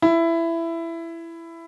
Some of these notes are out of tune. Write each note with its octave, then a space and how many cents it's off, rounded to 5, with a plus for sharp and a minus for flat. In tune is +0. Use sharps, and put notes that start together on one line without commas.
E4 +15